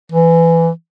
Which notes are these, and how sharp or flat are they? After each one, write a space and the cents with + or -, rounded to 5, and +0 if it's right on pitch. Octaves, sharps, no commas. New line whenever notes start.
E3 +15